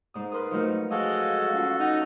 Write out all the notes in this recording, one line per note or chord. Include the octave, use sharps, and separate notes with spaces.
G#2 D#6
A#4 B4 C6 D#6
F3 F#3 A3 D#4
G#3 F#4 A4 D#5 F5
C#4 F4
D#4 F#5